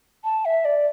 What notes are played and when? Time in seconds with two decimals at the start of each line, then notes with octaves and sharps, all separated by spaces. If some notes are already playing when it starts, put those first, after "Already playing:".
0.24 A5
0.45 E5
0.65 D5